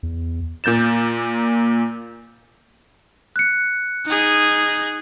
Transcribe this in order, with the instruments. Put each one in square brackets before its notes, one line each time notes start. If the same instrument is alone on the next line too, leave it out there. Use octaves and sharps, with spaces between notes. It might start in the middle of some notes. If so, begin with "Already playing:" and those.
[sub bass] E2
[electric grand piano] A#2 A#3 G6 A6 E7
[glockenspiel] F#6 C#7
[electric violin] D#4 G#4